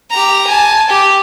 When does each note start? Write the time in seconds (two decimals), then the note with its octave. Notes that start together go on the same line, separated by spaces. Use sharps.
0.11 G4 A#5
0.47 G#5 A5
0.89 G4